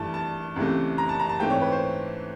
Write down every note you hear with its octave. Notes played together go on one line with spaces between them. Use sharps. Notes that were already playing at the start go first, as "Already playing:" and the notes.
Already playing: G2 E3 A3 A5
A5
C#2 C3 E3 A3
A#5
A5
A#5
A5
G#2 E3 A3 C4 G5
C#5
B4
C5